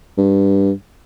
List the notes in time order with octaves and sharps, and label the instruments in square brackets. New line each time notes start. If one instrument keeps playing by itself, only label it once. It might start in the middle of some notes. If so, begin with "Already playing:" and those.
[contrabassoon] G2